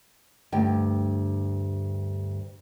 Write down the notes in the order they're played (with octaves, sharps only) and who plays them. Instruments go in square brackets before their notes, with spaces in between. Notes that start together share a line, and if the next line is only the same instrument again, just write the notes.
[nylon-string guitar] D2 G2 G5